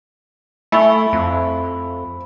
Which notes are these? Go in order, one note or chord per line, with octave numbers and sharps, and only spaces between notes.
A3 E4 G#5 B5 C#6
F2